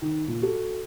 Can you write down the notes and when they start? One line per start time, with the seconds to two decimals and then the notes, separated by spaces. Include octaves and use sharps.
0.02 D#3
0.28 A#2
0.42 F#4 A4